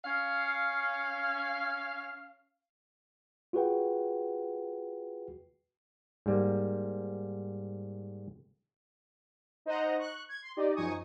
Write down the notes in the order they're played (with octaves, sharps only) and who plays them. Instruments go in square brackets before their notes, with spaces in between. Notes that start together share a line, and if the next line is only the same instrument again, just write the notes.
[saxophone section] C#4 F5
[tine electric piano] F4 F#4 G#4 B4 F#5 G5
[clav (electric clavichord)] G#2 G3 A#3
[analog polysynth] D#4 C5 D#5 F#5 A#5
C#6 F#6
G#6
C6
D#4 G4 D5 D#5
F#2 F3 D#4 G#5 C#6 D#6